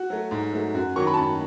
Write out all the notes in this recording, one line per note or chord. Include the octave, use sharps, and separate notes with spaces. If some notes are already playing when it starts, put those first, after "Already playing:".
Already playing: F#4
F#3 A3
G#2
F#3 A3
F#2 F#4
D#3 F#3 C#6
B5
A5
F#2 B5